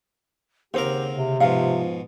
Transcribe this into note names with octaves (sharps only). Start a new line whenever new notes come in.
D#2 C#3 C4 G4 A#4 C5 F#5
C3
G#2 B2 F3 F5